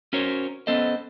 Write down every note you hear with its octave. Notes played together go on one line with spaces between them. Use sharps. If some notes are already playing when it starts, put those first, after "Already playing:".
C#4 F#4 A#4 C5 C#5
B3 C#4 A4 C5 D#5